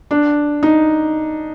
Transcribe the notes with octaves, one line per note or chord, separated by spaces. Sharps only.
D4
D#4